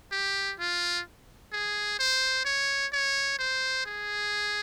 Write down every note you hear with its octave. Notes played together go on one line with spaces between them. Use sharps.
G4
F4
G#4
C5
C#5
C#5
C5
G#4